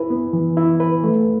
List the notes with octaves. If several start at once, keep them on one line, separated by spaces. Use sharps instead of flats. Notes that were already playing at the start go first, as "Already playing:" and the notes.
Already playing: E4 B4
B3
E3
E4
B4
A3